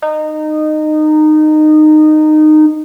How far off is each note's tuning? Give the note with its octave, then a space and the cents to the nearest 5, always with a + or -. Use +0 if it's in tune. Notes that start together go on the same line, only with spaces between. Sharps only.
D#4 -20